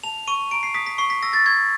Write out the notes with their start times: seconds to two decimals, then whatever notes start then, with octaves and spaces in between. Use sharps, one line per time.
0.03 A5 F7
0.27 C#6 D#7
0.51 A#5 D7
0.63 C7
0.74 D#6 B6
0.86 B6
0.98 C#6 C7
1.10 B6
1.23 E6 A#6
1.33 A6
1.46 C#6 G#6